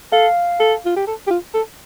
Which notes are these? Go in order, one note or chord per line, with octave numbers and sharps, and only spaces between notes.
A4 F5
A4
F4
G4
A4
G4
F4
A4